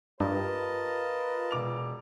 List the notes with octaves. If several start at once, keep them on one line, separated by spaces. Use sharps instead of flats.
G2 F4 G4 A#4 B4 D#5 A5
E1 D6 F7